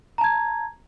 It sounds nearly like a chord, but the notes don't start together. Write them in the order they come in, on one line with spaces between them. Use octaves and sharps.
A#5 A5 G#6